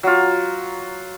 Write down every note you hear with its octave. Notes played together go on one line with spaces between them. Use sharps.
F#3 F4